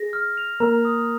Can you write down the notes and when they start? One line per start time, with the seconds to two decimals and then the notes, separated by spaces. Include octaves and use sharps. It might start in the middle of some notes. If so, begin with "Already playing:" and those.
Already playing: G#4 A#6
0.13 F6
0.37 F7
0.60 A#3 A#4 A#5
0.85 D#6